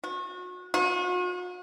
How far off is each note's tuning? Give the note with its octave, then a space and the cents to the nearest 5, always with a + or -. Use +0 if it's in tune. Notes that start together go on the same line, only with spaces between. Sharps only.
F#4 -35
F#4 -45